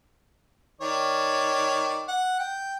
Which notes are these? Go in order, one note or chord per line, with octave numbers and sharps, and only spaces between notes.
D#3 C#5 D5
F#5
G5